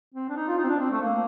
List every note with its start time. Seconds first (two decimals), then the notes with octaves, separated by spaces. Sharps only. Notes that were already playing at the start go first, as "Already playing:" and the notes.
0.15 C4
0.29 D4
0.36 D#4
0.48 F4
0.58 D#4
0.64 C4
0.69 D4
0.80 C4
0.91 A3
1.02 A#3